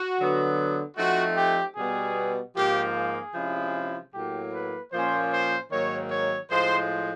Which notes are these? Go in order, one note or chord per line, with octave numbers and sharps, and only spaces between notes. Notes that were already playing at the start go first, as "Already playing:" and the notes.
Already playing: F#4
D3 F#3 B3
F3 A3 C4 D#4 F#4
G4
B2 G3 B3 G#4
G#2 F3 A#3 G4
G#4
C3 F3 G#3 C#4 E4
A2 F#3 A#3 G4
B4
A#2 F3 A#3 C#4 C5
C5
G#2 D#3 F#3 A#3 C#5
C#5
A2 F3 G#3 C5